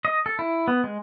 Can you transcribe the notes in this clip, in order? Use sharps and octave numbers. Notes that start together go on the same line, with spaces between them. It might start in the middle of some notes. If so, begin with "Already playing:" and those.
D#5
A4
E4
B3
G#3